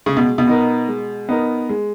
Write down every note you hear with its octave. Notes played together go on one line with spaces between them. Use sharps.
C#3 G#3
B2
B2
B3 D#4 A#4
G#3
B3 D#4 A#4
G#3